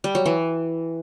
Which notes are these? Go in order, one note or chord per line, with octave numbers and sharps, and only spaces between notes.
G3
F#3
E3